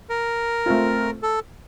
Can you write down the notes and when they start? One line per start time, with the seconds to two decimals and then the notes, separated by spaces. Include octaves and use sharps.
0.10 A#4
0.66 A3 C4 F4
1.23 A4